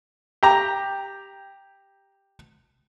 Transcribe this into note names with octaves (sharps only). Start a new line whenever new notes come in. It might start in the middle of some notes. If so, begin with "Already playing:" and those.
G4 A#5